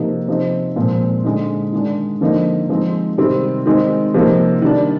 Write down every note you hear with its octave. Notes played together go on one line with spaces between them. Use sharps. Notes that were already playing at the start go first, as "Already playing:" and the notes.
Already playing: C3 F3 A#3 D#4
C3 F3 C4 D#4
A#2 F3 G#3 C4
D3 G#3 D#4
D#3 G#3 D4
D3 F3 A#3 D#4
F3 G#3 C4 D#4
C3 D#3 G3 C4
D#3 G#3 C4 D#4
C3 F3 A#3 D#4
D#3 G3 D4